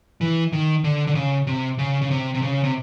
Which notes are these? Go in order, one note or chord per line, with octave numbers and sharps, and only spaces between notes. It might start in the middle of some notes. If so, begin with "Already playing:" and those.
E3
D#3
D3
D3
C#3
C3
C#3
C#3
C3
C3
C#3
C3